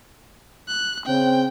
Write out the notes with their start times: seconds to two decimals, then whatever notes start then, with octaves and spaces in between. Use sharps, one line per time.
0.68 F#6
1.06 C#3 C4 G5